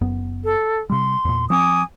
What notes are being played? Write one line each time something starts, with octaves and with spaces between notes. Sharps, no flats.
F#1 F#2 B3
A4
C3 G3 C6
E2 A#2
F3 C4 G#5 D6 D#6